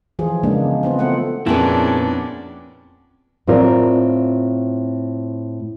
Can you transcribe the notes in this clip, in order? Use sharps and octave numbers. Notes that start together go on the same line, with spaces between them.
E3 F3 F4 G#4
C#3 G#3 A#3 B3 D4
B3 C4 F4
A3 C4 F4 F#5
F2 A#2 B3 C#4 D4 E4 G#4 A#4
A2 C4 F4 A#4 D5